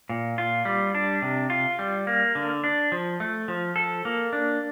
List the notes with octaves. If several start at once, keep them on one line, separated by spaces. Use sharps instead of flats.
A#2
F4
G3
D4
C3
F4
G3
A#3
D3
D4
F3
A3
F3
A4
A#3
D4